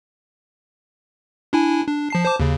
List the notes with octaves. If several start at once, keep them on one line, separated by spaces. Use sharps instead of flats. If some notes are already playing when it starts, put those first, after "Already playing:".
D4 E4 G#5
D4
F3 A5 C7
C5 A5 D6
D#2 C#3